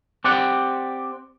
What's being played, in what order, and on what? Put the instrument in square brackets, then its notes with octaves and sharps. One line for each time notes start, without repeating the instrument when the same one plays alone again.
[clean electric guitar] C4 G4 D5 F#5